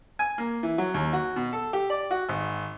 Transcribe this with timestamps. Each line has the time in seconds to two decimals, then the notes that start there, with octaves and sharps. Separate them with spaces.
0.19 G#5
0.38 A#3
0.63 E3
0.78 F#3
0.94 D#2
1.13 F#4
1.36 B2
1.53 A4
1.73 G4
1.90 D5
2.11 F#4
2.29 G#1